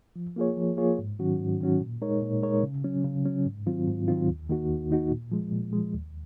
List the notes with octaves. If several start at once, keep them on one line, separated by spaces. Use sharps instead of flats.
F3
A#3 F4 G#4 C#5
F3
A#3 F4 G#4 C#5
G#2
D#3 F#3 C#4 F#4
G#2
D#3 F#3 C#4 F#4
A#2
G#3 D#4 A#4 C#5
A#2
G#3 D#4 A#4 C#5
C#3
F#3 C#4
C#3
F#3 C#4
G#2
D#3 F#3 C4 F4
G#2
D#3 F#3 C4 F4
D#2
D#3 A#3 D#4 F#4
D#2
D#3 A#3 D#4 F#4
A#2
F3 G#3
A#2
F3 G#3
D#2